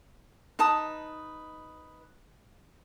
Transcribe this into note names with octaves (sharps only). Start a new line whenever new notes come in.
D#4 B4 A5 D#6